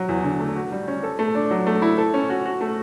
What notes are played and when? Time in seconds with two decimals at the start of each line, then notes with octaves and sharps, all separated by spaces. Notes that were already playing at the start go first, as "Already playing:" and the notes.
Already playing: F#3
0.09 E2
0.24 D3
0.40 A3
0.55 F#4
0.72 G3
0.88 C#4
1.03 A4
1.19 A3
1.35 D4
1.51 F#3
1.67 A3
1.82 E4
1.98 A4
2.14 C#4
2.30 F#4
2.45 F#4
2.61 A3